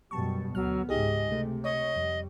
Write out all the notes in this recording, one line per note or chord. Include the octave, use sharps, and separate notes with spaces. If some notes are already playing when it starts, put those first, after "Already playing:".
F#2 B2 G3 A5 C#6
D2 F#3 B3 F6
C#2 G#2 D#4 G4 G#4 D#5
C3 A3
C#5 D#5 C#6
F2 G3